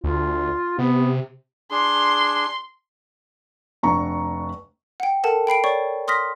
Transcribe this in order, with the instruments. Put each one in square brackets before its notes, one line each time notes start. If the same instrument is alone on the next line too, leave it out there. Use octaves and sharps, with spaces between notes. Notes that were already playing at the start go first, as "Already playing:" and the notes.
[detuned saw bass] D2 [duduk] F4
[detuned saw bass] C3 [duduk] B3
[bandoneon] D4 G#4 [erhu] C6
[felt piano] F1 D4 A#5 C#6
[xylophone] F#5 G5
A4 A#4 F#5 A5
G5 B5 C7 D7
C#5 D5 C#6
C6 D#6 F6 A#6 B6